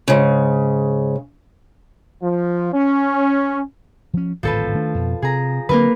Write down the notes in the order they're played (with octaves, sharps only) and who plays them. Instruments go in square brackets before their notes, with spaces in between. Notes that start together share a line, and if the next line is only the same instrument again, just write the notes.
[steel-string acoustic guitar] G#2 C#3
[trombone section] F3
C#4
[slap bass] F3 C#4
[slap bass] D1 G#1 [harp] F3 A4 B4
[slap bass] D#3 A3 D4
F2 B2
[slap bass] C3 [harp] G#4 A#5
[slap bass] D3 F#3 C4 [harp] A#3 A#4 B4